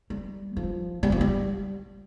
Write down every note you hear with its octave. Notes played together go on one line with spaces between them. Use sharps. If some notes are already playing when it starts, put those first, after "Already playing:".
G3
F3
G3
F3
G3